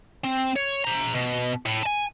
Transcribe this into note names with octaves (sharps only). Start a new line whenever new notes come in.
C4
C#5
C5 A#5
B2
A2
G#5 A5